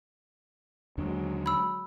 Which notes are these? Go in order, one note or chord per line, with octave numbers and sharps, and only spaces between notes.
D#2 D3 F#3 G#3 D4
B5 E6